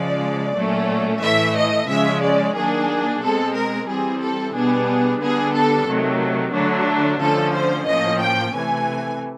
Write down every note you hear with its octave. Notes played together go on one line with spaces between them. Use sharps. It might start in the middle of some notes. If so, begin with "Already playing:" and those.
Already playing: C#3 F3 G#3 D5
A#2 F#3 A3 C#4
A2 E3 A3 E5
D#5
C#3 F3 G#3 C#4 E5
D5
D#3 F#3 A#3 D4 G#4
B2 G#3 C4 A4
A#4
E3 G3 C4 G#4
A4
B2 G3 B3 D4 G#4
D3 G3 B3 D4 G#4
A4
C3 D#3 F#3 A3
D3 F#3 A3 D4
D3 F3 A3 C#4 A4
C5
A2 F3 A#3 C#4 D#5
G5
C3 E3 A3 G#5